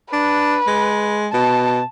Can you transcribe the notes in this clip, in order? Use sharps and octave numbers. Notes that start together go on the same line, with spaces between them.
D4 B4
G#3
B2 A5